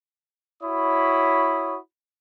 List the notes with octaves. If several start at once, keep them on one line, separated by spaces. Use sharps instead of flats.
E4 F#4 C#5 B5 D#6